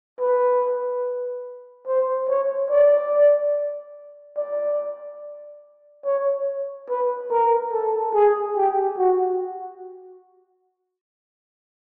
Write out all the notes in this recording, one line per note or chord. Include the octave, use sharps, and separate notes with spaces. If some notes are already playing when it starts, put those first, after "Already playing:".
B4
C5
C#5
D5
D5
C#5
B4
A#4
A4
G#4
G4
F#4